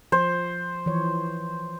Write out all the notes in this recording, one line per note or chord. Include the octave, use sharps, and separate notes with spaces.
F3 C5
E3 F3 C#5